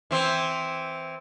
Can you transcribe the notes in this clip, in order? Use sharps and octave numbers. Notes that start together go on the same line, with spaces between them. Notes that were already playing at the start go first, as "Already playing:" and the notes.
E3 C4